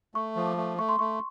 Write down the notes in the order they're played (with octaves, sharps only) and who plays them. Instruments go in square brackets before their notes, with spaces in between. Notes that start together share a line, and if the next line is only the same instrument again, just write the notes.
[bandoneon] A3 [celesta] C#6
[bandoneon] F3
[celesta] D6
[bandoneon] A3
[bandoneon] A3 [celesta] C#6
[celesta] C6
[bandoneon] A3 [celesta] C#6